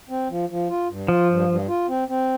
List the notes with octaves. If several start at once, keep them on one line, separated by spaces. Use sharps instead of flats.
C4
F3
F3
F4
G2
F3 F4
G2
G2
F4
C4
C4